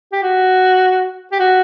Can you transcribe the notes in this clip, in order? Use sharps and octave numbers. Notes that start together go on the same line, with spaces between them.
G4
F#4
G4
F#4